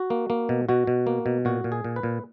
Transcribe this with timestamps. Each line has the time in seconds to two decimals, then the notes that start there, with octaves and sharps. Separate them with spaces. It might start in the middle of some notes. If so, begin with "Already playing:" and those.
Already playing: F#4
0.10 A#3
0.30 A#3
0.49 B2
0.69 B2 F#4
0.87 B2
1.07 A#3
1.26 B2
1.45 A#2 F#4
1.64 A#2
1.72 G#4
1.84 A#2
1.96 B4
2.03 A#2